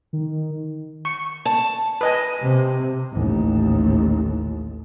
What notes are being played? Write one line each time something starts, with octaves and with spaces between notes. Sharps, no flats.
D#3
C#6
A5
B4 D#5 G#5
C3
A1 D#2